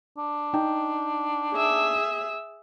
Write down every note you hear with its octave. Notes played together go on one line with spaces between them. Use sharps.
D4
D#4 G5
G#4 E5